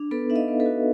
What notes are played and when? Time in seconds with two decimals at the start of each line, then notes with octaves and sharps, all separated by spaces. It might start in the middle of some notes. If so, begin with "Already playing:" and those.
Already playing: D4
0.11 B3 A4 B4
0.30 D#4 E5
0.35 D#5 F5
0.48 B3
0.60 A4 B4
0.66 F#4